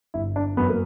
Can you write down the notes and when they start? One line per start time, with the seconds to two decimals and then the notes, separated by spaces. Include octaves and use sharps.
0.14 G1 E4
0.36 D4
0.57 F#2 B3
0.69 A#3